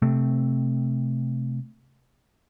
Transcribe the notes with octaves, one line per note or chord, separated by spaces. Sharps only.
C3 A3 C4